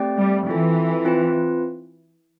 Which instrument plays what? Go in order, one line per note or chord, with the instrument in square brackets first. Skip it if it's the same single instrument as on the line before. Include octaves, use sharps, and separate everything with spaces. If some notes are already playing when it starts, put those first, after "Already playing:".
Already playing: [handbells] A3 C4 G4 D5 G5
[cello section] G3
[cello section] E3 [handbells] C4 F4 A4
[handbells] C4 F4 B4